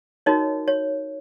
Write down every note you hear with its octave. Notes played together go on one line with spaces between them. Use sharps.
D#4 F#4 A#4 C#5 D#5
C#5